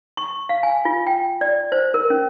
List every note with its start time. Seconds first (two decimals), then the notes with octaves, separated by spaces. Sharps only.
0.17 C#6
0.49 F5
0.63 G#5
0.85 F4
1.07 G5
1.41 D5
1.72 C5
1.94 A#4
2.10 C#4